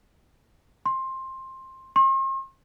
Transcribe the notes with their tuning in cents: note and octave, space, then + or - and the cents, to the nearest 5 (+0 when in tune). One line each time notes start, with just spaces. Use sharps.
C6 +15
C6 +45